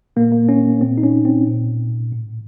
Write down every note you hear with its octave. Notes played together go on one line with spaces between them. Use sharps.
A#2 A#3
A#3
C#4
A#2 C4
D#4
C#4
C4
A#2
A2